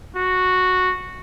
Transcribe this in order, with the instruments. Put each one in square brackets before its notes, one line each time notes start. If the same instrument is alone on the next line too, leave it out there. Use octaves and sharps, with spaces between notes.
[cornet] F#4